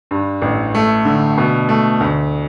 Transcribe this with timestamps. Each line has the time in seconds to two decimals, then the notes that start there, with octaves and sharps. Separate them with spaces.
0.11 G2
0.42 A1
0.75 A3
1.05 D3
1.38 B2
1.69 A3
2.00 D2